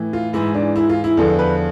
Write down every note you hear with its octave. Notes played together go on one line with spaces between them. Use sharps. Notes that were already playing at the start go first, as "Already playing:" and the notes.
Already playing: A2 E3
F4
G#2 E3 E4
D4
E4
F4
E4
E2 D3 F3 A4
B4